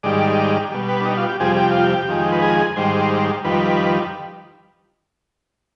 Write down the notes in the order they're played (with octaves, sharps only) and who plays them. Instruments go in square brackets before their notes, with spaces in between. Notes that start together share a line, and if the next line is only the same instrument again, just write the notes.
[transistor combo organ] G#2 D#3 G3 D5
B2 G3
B4
D4
D#4
F4
G4
F2 C3 G3 G#4
G4
F4
G4
F2 D#3 G#3
B4
G#4
G#2 D#3 G3 C5
F2 D#3 G3 B4